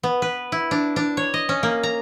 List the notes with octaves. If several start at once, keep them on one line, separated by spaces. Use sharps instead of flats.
B3
B4
E4
D4
D4
C#5
D#5
C#4
A#3
A#5